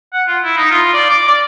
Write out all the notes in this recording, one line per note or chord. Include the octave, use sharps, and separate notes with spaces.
F#5
F4
E4
D#4
F4
D5
D6
D5